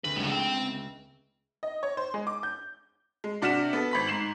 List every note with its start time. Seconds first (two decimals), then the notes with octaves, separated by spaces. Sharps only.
0.04 D2 A3 C4 B4
0.16 C#2 A2 G3 G#3
0.30 C4 G5
1.63 D#5
1.83 C#5
1.97 C5
2.14 G#3
2.27 D6
2.43 G6
3.24 G#3
3.42 C3 D4 F#4 F6 B6 E7
3.73 B3 A4
3.91 G#1 B5 B6
4.07 G#2 C7 E7 F#7